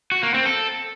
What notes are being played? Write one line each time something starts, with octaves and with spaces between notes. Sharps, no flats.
F#4
A#3
C4
A4